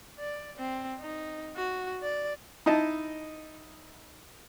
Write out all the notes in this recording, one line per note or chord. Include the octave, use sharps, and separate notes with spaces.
D5
C4
D#4
F#4
D5
D#4 E4 D#5 A5